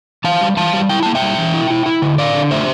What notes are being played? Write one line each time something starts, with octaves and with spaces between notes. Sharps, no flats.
E3 F5 A5
G3
E3 F5 A5
G3
E4 G5
A#3 A5
E5 G5
G3
E3
E4
E4
E4
D3
D3 D5 F5
D3
A3 C5 E5